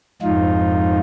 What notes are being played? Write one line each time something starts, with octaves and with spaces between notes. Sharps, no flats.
F2 G#2 D#4 F4